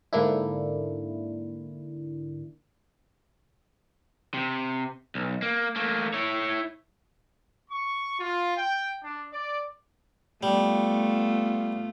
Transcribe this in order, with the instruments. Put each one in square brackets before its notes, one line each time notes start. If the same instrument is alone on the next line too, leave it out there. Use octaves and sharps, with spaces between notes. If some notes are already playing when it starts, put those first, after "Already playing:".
[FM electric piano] G#2 D3 A#3 D4 E4
[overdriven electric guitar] C3
B1
A#3
A3 A#3
E4 C#5
[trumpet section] C#6
F4
G5
D4
D5
[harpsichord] G3 [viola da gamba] A3 B3 F4